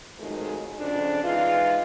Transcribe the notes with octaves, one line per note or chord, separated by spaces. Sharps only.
F2 D#3 F#3 G#3 A3
F2 C#3 F3 D4
E3 G#3 D#4 F4